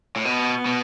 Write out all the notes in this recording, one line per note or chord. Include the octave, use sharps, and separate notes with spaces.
A2
B2 B3
B2